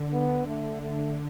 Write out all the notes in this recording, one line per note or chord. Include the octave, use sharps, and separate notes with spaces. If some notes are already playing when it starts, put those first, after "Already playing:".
Already playing: D3
B3
A3
A3